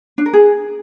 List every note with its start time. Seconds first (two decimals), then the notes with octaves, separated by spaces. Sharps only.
0.18 D4
0.26 A#4
0.33 G#4